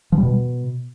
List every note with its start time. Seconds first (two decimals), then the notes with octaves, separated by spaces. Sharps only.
0.12 F3
0.18 G3
0.23 B2